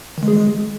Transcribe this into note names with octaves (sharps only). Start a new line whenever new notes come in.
D#3
G#3
G#4
G#3